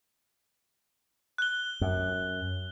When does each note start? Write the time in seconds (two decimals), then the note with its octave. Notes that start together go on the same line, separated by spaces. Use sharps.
1.38 F#6 G7
1.81 F#2